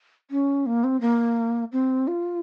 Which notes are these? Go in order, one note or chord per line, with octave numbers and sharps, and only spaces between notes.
C#4
A#3
C4
A#3
C4
F4